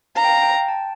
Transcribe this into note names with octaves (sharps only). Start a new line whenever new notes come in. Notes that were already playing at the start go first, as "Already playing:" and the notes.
F5 A#5
G5
F5
G5
G5
A5